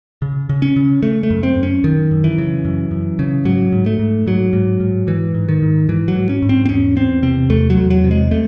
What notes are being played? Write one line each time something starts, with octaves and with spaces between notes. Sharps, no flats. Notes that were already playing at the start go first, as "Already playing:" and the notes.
C#3
C#3
C#4
C#3
C#3 A3
A3
F#2
C4
F#2
C#4
F#2 D#3
F#2
E3
C#3
F#2
F#2
C#3
G#2 F#3
G#2
A3
G#2
G#2 F#3
G#2
G#2
G#2 E3
G#2
D#3
G#2
G#2 E3
F#3
G#2
C#4
G#2
C4
C4
E2 C#4
E2 C4
C3 C4
E2 A3
F#3
E2
F#3
C3
G#3
C3 A3